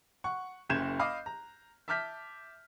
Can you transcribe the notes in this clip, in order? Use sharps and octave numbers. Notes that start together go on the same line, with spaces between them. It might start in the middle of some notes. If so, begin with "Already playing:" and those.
F#5 C#6
F#1 F#2 G6 G#6 E7
D#5 F5 B5 D6 D#6
A#5
E5 A5 D6 F6 G6 B6